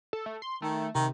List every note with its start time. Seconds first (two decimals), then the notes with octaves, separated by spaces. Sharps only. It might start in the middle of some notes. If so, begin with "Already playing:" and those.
0.13 A4
0.26 A3
0.42 C6
0.62 D#3 A3
0.95 C3 D#3